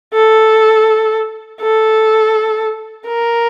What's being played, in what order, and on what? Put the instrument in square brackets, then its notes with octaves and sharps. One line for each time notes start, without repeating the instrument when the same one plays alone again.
[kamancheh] A4
A4
A#4